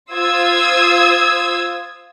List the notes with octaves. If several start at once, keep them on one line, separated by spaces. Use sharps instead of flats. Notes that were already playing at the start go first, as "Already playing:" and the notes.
F4 C5 D#6 E6 G#6